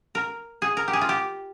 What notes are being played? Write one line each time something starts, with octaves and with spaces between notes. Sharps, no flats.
A#4
G#4
A#4
G4
G#4
F4
G4